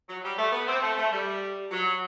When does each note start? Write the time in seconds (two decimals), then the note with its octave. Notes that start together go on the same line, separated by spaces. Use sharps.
0.09 F#3
0.23 G3
0.38 A3
0.52 B3
0.67 C4
0.82 A3
0.97 A3
1.12 G3
1.71 F#3